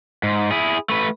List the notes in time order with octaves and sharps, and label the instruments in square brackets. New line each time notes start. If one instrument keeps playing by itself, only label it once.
[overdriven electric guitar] G#2
E4 G#4
A3 B4